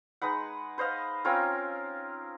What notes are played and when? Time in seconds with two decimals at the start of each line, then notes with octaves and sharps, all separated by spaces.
0.22 G#3 D#4 B4 F#5
0.78 B4 C5 D#5 F5
1.25 C4 C#4 F4 A#4